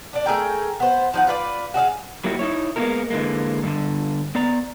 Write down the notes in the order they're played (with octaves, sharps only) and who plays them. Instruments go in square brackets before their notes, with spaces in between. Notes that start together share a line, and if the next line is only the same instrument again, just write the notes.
[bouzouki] D4 D5
A3 G#4 A#4 G5
B3 C5
F3 D#4 F#5
F4 B4 C#5 D5
F#4 G#4 D#5 F5
[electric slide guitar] F#3 G3 A#3 E4 F#4 G4
D#4 E4 C#5
G#3 A#3 B3 E4 F#4 A#4
D3 E3 G#3 A#3
G2 D3
B3 D5 A#5